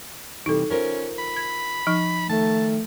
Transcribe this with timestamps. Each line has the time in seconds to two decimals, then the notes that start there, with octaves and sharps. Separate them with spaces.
0.46 C3 E3 G3 D#4 A4
0.70 C#4 F4 A#4 C5
1.19 B5
1.37 G#6
1.87 F3 D#4
2.30 D#3 A3 A5